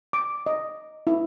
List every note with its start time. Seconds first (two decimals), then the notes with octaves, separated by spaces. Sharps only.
0.13 D6
0.46 D#5
1.07 E4